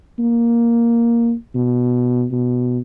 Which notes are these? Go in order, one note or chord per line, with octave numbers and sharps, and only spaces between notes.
A#3
B2
B2